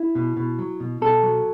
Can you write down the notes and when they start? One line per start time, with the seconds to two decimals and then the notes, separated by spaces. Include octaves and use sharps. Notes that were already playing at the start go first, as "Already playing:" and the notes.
Already playing: E4
0.15 B2
0.37 B2
0.59 F#3
0.80 B2
1.01 B2 A4
1.23 F#3